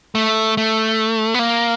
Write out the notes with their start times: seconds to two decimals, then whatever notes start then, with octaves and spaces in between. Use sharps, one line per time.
0.15 A3
0.57 A3
1.34 B3
1.39 A#3